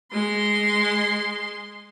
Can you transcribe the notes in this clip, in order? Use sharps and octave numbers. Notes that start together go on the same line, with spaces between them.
G#3 C6